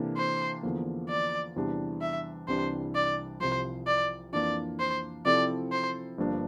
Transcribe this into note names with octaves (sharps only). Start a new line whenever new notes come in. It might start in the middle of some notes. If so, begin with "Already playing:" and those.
Already playing: C3 E3 A#3 D4 A4
C5
E2 D3 F3 A#3
D5
E2 C3 E3 G3 D4
E5
C2 C3 E3 G3 D4 C5
D5
C2 C3 F3 C5
D5
F2 E3 A#3 D4 F4 D5
C5
C3 F3 C4 E4 A4 D5
C5
G1 G2 F3 A#3 D4